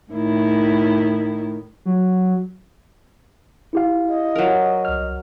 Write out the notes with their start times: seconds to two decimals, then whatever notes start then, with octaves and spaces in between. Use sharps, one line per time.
0.11 A2 D#3 E4
1.85 F#3
3.73 E4 G4 F5
4.09 D#5
4.36 F#3 A#4
4.85 C2 F6